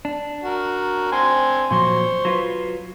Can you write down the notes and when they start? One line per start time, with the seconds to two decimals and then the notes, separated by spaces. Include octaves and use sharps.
0.05 D4
0.44 F#4 A#4
1.12 C4 G#5 C6
1.71 A#2 F3 F#3 C5 C6 C#6
2.25 F#3 F4 B4